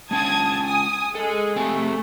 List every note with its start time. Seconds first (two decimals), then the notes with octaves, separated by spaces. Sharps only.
0.11 G#3 C#4 G5 A5 D#6 G#6
0.63 G#5 D#6
1.15 G#3 G#4 A4
1.56 A3 C4 G4 G#5